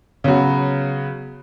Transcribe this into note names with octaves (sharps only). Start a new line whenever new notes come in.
C#3 F#3 B3 F#4